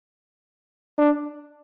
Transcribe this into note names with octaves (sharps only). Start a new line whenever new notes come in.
D4